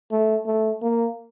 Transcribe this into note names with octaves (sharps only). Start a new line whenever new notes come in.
A3
A3
A#3